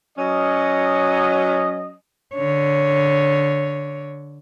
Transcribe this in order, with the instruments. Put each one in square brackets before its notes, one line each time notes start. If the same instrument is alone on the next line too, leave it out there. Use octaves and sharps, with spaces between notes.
[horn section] F#3 C#4 D#5
[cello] D3 C#5